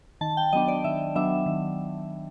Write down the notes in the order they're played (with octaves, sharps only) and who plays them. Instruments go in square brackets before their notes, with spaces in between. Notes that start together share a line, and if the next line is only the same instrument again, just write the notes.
[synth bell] D#3 A5
G5
F#3 B3 D4 D#5
D5
D#3 E5
F#3 B3 D4 E5
D#3